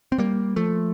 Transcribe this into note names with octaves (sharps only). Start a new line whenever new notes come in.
C4
G3 A#3
F3 A3